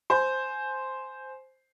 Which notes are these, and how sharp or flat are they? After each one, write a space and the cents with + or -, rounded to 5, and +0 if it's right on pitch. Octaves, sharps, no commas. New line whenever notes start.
C5 +0 G#5 +20